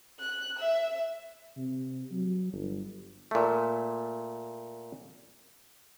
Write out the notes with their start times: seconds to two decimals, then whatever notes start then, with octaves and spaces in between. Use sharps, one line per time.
0.20 F#6
0.58 E5
1.57 C3
2.12 F#3
2.53 G1
3.31 A#2 A3